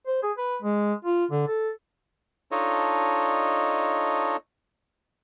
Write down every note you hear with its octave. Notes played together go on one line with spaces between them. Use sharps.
C5
G#4
B4
G#3
F4
D3
A4
D4 D#4 F4 A4 C#5 D#5